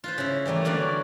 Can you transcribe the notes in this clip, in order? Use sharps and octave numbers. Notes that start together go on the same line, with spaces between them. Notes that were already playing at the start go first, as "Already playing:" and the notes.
F4 B4 C5
C#3 E4
E3 G3 A3 A#3
D3 A#3 C#4 F#4 D5